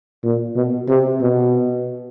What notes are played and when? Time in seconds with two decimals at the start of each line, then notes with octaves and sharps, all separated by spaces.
0.24 A#2
0.56 B2
0.88 C3
1.21 B2